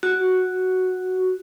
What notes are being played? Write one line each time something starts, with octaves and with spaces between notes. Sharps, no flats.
F#4